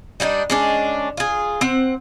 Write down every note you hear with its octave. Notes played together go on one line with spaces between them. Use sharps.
G3 A#3 D4 D#4
G#3 C#4 D4
F4 G#4
C4 F#5